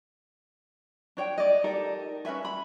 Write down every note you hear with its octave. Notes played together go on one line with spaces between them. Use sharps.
D4 C#5 G5
D5 D#5
D#4 G4 A4 A#4
C#4 B4 E5 G#5
B5